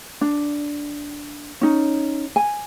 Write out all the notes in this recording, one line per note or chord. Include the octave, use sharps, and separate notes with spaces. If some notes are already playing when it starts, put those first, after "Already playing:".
D4
C#4 D#4
G#5